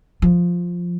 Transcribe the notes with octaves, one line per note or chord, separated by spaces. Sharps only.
F3